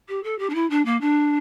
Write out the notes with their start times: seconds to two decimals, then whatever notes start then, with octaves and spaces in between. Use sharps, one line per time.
0.08 G4
0.23 A4
0.38 G4
0.49 D4
0.54 E4
0.70 D4
0.85 A#3
1.01 D4